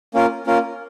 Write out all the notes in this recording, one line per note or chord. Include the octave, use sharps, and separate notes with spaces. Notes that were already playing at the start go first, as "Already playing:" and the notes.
A#3 C#4 F4 A#4
A#3 C#4 F4 A#4